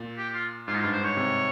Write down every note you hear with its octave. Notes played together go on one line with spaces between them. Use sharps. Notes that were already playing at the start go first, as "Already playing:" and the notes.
Already playing: A#2
G4
F4
G#2 F4
D#4
F4
G2
C5
G#2 C#5
C3